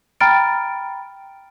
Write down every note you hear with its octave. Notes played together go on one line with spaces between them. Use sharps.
G5 A#5 B5 F6 A6 D7